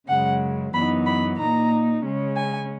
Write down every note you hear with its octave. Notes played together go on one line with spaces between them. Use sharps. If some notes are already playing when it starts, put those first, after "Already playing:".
F#2 C#3 G#3 F#5
F#2 E3 B3 D#4 B5
B5
A#2 A#3 D#4 A#5
C#3 G#3 C#4
G#5